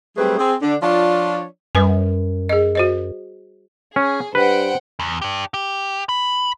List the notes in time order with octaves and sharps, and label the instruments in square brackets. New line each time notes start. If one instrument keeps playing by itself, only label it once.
[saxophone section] F#3 G3 A3 C4 G#4 B4
C4 G#4
D3 D4
F3 D4 F4 C#5 D5
[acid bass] F#2 [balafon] G3 B4 G#5
[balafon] G#4 D#5
F#4 C5 D#5
[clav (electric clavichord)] C#4 [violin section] G#4
[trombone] G2 [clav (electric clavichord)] B4 [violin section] C5 F#5 G5
[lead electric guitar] E2
D4 G4
G4
B5